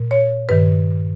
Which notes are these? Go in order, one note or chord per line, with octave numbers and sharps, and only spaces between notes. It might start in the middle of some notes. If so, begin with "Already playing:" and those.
Already playing: A#2
C#5
G2 D#3 B4